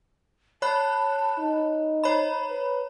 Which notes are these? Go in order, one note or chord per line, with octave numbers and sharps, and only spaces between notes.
C#5 A5 B5 F#6
D#4
C5 C#5 A#5 B5
B4